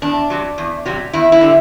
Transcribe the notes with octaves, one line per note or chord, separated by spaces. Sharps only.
E2 D4
C3 F#3
E2
C3 F#3
E2 E4
E4
D3 G3